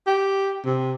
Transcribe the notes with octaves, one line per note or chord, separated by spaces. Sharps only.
G4
C3